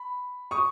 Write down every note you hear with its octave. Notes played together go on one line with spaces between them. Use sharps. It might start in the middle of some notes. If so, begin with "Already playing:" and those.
Already playing: B5
C#6 D#6